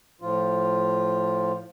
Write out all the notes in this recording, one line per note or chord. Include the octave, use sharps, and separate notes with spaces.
A2 F3 F4